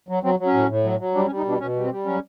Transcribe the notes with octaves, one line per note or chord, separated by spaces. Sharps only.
F#3
F#3 C4
F#3
C#4
A2
A2
F#3
F#3
G3 D4
C#4
G3
D#4
B2 D4
B2 C#4
G3
C4
G3
F#3 C#4